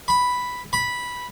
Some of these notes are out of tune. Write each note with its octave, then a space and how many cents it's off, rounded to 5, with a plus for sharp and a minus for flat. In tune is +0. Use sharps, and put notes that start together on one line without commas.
B5 +0
B5 -10